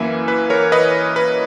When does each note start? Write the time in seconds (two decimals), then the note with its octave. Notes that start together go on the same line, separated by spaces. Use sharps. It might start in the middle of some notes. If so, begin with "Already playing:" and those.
Already playing: F#2 E3 A#3 E5 G#5
0.28 B4
0.50 A#4 C#5
0.72 B4 D#5
1.16 B4